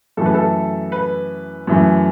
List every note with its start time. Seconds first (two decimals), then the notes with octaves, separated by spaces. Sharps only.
0.17 F#2 E3 A3 A4
0.26 B4
0.34 A4
0.92 B4
1.67 F#2 E3 A3